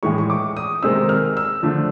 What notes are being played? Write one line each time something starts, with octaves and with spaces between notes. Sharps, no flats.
A2 E3 G#3 C#6
C#6
D6
D#6
C3 D#3 G#3 C4 D#4 E6
F6
E6
D3 F3 A3 D4